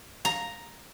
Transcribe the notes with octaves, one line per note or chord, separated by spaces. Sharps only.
A#5